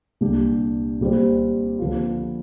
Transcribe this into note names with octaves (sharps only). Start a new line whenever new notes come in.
C2 A#2 G3 D4 G4
A#2 G3 C4
D3 F3 A#3 F4